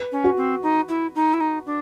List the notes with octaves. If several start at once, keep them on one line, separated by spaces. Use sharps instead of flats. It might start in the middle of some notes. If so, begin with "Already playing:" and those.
Already playing: B4
C#4
F#4
C4
D#4
E4
D#4
E4
D#4
D4